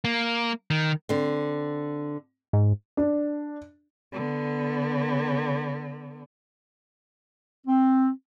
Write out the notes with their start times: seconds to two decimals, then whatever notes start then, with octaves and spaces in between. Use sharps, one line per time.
0.04 A#3
0.70 D#3
1.09 D3 C4
2.53 G#2
2.97 D4
4.13 D3 B3
7.67 C4